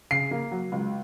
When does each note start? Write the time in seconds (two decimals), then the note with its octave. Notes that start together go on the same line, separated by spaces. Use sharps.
0.11 C#3 C7
0.31 A#3
0.51 F#3
0.72 C#2